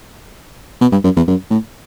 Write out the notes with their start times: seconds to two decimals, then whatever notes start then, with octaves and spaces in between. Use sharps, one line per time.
0.81 B2
0.92 G2
1.04 F#2
1.16 E2
1.28 F#2
1.51 A2